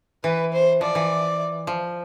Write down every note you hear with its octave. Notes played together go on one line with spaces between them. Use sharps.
E3 B4
C5
F3 D5
E3
F3